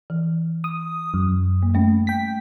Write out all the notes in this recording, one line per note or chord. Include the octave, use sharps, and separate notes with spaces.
E3
D#6
F#2
A#3
G3 A3 C#4
G5 B6